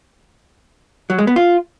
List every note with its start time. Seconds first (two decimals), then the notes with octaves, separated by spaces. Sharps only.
1.10 F#3
1.18 G#3
1.27 B3
1.36 F4